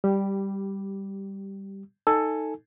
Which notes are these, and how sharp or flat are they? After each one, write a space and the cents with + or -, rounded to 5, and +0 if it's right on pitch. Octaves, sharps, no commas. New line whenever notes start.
G3 +0 G4 -15
D#4 +5 A4 +10 G#5 +0